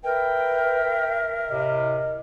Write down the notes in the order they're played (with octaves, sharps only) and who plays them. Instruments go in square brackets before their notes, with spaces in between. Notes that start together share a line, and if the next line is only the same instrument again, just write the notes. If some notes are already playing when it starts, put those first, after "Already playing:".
[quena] A#4 [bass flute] B4 [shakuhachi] E5 [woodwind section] G5
[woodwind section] A2 C3 [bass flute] D#5